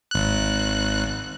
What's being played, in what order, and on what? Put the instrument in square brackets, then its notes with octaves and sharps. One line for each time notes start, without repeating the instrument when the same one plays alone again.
[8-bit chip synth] G#1 F#6